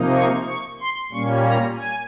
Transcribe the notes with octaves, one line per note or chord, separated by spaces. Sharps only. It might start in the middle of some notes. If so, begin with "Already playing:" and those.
Already playing: C3 F3 A#3 D#4
C#6
C#6
C6
A#2 G3 A#3 C#4 C#6
A#5
G#5